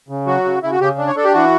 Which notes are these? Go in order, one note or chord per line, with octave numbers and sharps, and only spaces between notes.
C#3
F#3 F#4
C#3
C#3 E4
F#4
C#3 G4
D4
C#5
D4 A4
G4
E3 F#4